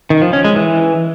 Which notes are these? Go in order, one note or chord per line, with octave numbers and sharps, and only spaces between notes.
D#3
F3
C#4
G#3
E3